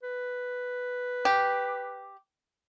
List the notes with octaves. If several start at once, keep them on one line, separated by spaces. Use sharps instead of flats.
B4
G4